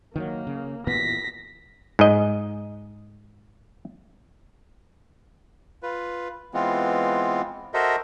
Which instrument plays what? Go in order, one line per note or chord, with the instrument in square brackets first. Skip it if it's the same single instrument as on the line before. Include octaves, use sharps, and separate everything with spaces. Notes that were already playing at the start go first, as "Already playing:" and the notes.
[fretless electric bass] D#3 E3 F#3 [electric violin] A#3
[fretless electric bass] C#3
[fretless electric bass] A#2 E3 B3 [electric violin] A#6 B6
[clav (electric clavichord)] G#2 D#5
[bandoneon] F4 B4
E3 G#3 B3 C4 F4
F#4 A4 A#4 C5 D#5 E5